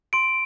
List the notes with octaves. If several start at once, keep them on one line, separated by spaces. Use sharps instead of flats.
C6 D7